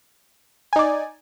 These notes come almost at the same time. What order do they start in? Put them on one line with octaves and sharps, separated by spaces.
G#5 D#4 D5